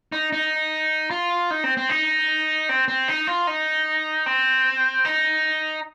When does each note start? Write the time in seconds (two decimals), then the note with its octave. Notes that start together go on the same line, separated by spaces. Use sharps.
0.12 D#4
0.33 D#4
1.11 F4
1.51 D#4
1.64 C4
1.77 C4
1.89 D#4
2.69 C4
2.88 C4
3.08 D#4
3.27 F4
3.47 D#4
4.26 C4
5.05 D#4